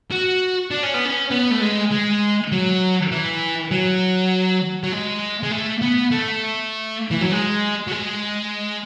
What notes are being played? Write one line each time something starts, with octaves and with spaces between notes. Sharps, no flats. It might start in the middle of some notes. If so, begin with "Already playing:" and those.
F#4
D4
C#4
B3
C#4
B3
A3
G#3
G#3
F#3
E3
F#3
F#3
G#3
G#3
A3
B3
A3
E3
F#3
G#3
F#3
G#3